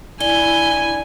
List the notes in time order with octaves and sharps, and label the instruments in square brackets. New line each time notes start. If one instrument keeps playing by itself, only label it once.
[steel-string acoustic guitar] D3 [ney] E4 [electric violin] G#5 [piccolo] G7